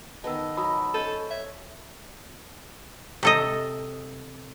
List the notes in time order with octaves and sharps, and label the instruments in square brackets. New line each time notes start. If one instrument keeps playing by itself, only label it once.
[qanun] D#3 B3 [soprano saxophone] D#5 [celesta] A5 E6
[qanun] F#3 [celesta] A5 D#6 E6 [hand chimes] B5
[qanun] C#4 C5 [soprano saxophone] A4 [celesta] D#5 G6 D#7
[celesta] C#5 G#6 [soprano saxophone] E5
[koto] C3 A4 D#5